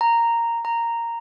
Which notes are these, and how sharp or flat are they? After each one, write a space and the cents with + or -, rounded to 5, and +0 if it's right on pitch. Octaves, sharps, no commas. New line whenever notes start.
A#5 -5
A#5 -5